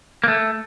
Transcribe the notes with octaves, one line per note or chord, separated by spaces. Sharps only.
A#3
A3